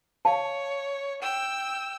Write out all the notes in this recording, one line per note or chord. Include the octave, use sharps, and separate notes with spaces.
C#5 F5 A5
G5 E6